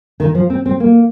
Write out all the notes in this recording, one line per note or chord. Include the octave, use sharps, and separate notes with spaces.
D#3
F3
C4
C4
A#3